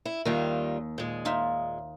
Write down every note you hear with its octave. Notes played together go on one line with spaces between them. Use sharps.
E4
D#2 D#3 G3 F4
A#2 G#3
D#4 F4 E5